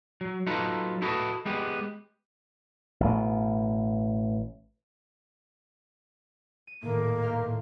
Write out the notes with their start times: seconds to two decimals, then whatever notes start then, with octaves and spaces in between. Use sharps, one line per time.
0.21 F#3
0.47 F#3 D#4 F4 A4 B4
1.02 E4 F#4 A4 B4 D#5
1.46 G#3 B3 G4
3.00 A1 B2
6.67 D#7
6.82 A2 D#3 A#3
6.94 D#1
7.23 B4 C5 F5
7.41 A2